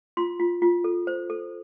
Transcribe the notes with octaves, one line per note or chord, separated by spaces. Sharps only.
F4 C6
F4
F4
A4
C5
A4